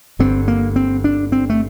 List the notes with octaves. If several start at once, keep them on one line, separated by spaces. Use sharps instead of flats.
G1 G2 D3 C4
A#3
C4
D4
C4
A3